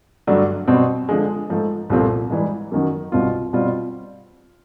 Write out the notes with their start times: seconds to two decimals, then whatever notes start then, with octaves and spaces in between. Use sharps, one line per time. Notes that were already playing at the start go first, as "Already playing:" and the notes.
0.27 G2 D3 F#3 A3 D4
0.68 B2 G3 C4
1.09 D3 F3 G#3
1.50 G#2 F3 A3
1.90 C2 A#2 F3 A3 C4
2.30 G#2 E3 G3
2.72 F#2 D#3 F#3
3.12 C2 B2 G3 C4 F4
3.53 B2 G3 C4 F4